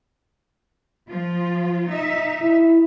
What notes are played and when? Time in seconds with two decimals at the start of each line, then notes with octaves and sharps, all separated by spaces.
1.09 F3 F4
1.90 D#4 E5
2.42 E4